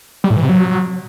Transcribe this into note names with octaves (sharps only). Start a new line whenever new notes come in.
G3
A2
E3
C3
F#3